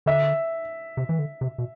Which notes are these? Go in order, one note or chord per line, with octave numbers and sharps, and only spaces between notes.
D3 E5
C3
E3
D3
C3
B2